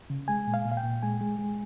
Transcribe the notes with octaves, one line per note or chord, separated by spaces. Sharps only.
C#3
G#3 G#5
A#2
F5
A#2
F5
G5
A#2
G#3 G#5
G#3
G#3